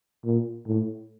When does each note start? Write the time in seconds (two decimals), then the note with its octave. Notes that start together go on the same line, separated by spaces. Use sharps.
0.25 A#2
0.66 A2